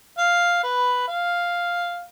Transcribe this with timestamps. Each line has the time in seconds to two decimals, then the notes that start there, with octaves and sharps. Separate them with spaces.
0.18 F5
0.63 B4
1.08 F5